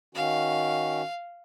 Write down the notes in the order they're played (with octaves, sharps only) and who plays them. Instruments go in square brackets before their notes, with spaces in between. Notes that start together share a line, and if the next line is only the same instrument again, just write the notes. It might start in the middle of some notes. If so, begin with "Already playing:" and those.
[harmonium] D#3 C#4 F#4 [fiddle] F5